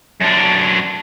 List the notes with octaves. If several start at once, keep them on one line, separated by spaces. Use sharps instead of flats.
F#2 D4